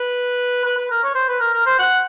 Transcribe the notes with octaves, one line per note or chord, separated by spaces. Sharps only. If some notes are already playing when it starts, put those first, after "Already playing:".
Already playing: B4
B4
B4
A#4
C#5
C5
B4
A#4
A#4
C5
F#5